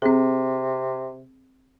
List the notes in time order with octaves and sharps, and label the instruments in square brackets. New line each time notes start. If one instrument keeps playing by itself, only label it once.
[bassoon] C3 [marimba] C4 G#4